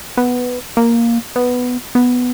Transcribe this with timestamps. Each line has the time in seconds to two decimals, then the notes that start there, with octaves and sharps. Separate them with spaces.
0.17 B3
0.77 A#3
1.36 B3
1.95 B3